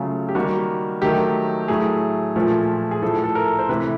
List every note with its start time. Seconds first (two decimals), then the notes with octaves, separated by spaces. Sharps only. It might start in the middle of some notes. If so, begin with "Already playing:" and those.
Already playing: C#3 F#3 A3 F4
0.29 G4
0.35 D#3 G3 A#3 F#4
1.02 D#3 F#3 A3 G4
1.68 A2 F#3 A3 G#4
2.36 A#2 F3 A3
2.91 G#4
3.02 A2 F3 A3 A4
3.24 A4
3.35 A#4
3.59 C5
3.69 C3 E3 A3 B4